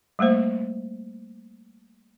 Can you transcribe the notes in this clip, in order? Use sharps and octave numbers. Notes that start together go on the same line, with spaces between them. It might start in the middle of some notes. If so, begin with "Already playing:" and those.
G3 A3 A#3 C5